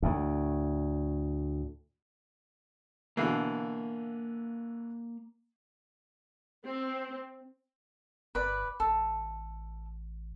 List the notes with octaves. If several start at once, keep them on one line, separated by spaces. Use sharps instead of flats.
D2 A2
B2 D3 E3 A#3 F5
C4
G1 B4 D5 B5
A1 A4